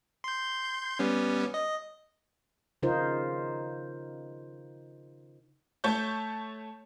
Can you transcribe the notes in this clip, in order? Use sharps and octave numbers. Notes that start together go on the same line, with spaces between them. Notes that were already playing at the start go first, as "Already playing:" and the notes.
C6 G6
G3 B3 C#4
D#5
C#3 D#4 F4 A#4 C5
A3 C#5 A5 C#6 G6